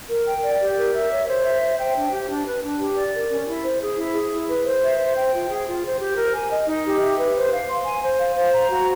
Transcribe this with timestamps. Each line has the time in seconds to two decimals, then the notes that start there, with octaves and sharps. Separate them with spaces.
0.09 A#4
0.27 G5
0.44 D5
0.61 G4
0.77 A#4
0.94 E5
1.11 C#5
1.28 C5
1.45 E5
1.62 C5
1.78 G5
1.95 D4
2.12 G4
2.29 D4
2.46 B4
2.63 D4
2.80 G4
2.97 D5
3.13 A#4
3.31 C#4
3.47 E4
3.64 C5
3.81 G#4
3.98 E4
4.14 G#4
4.31 E4
4.48 B4
4.65 C5
4.82 E5
4.99 C5
5.16 G5
5.33 F4
5.49 G#4
5.66 F4
5.83 C5
6.00 G4
6.17 A#4
6.34 G#5
6.51 D#5
6.68 D#4
6.85 G4
7.01 E5
7.18 B4
7.35 C5
7.52 F5
7.68 C6
7.85 G#5
8.02 C5
8.19 F5
8.36 C5
8.53 A#5
8.70 F#4